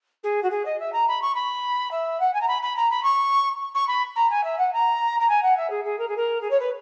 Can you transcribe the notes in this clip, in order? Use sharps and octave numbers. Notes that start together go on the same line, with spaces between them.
G#4
F#4
G#4
D#5
E5
A#5
B5
C#6
B5
E5
F#5
G#5
A#5
B5
B5
A#5
B5
C#6
C#6
B5
A#5
G#5
E5
F#5
A#5
A#5
G#5
F#5
E5
G#4
G#4
A#4
G#4
A#4
G#4
C#5
B4